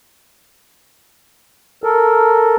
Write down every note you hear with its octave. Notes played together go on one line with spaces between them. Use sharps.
A4 A#4